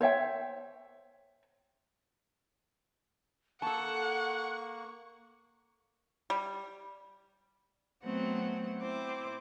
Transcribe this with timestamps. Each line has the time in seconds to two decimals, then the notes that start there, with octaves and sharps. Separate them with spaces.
0.01 C5 C#5 E5 G5
3.62 A#3 A4 F#5 A5 C#6
6.30 G3
8.03 F#3 A3 B3 C4 F#5
8.78 C4 E4 C5 D6